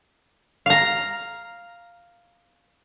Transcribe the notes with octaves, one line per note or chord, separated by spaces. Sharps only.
F5 A#5